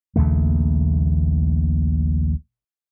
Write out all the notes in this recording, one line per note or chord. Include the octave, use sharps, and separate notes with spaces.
A#1 D#2 C#3 A3